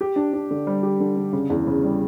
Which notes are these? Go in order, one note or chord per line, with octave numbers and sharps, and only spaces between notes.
G4
D4
D4
D3
G3
G4
D3
D3
C#3
E2
C#3
G3